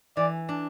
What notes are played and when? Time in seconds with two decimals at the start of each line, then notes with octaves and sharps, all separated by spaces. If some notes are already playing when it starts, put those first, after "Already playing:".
0.17 E3 D5
0.49 D4